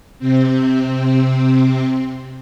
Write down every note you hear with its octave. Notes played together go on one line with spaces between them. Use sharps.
C3 C4